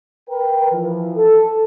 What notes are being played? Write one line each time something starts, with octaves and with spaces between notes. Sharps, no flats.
A#4 B4 G5
E3 F3
A4